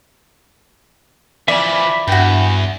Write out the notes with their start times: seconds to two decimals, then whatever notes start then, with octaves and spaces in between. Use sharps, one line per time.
1.48 E3 F3 D5 E5 B5
2.08 E2 G2 F#4 G5